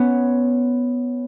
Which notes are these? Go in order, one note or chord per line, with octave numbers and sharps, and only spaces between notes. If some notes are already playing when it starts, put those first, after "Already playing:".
Already playing: B3 C#4